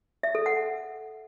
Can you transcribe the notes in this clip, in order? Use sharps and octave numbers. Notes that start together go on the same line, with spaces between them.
E5
A4
F#5